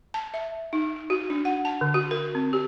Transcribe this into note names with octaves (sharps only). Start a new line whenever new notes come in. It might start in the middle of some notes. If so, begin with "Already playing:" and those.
A5
E5
D#4
F#4
D4
F#5
A5
D3
F#4
A#4
C4
G4